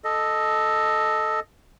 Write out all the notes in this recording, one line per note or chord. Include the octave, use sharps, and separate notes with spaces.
A4 D#5